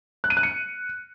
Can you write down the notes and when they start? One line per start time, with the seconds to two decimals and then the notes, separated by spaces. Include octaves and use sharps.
0.24 F#6
0.30 D#7
0.37 F#6
0.43 C#7